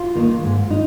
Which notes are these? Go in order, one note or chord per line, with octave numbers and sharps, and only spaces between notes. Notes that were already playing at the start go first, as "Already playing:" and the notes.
Already playing: F4
D#3 A#3 D#4
G#2
D#4